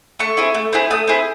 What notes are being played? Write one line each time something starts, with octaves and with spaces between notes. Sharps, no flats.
A3 C#6
C4 E4 G#4
A3
C4 E4 G#4
A3 D#6
C4 E4 G#4